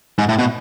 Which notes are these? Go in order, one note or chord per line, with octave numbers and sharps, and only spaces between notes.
G#2
A2
B2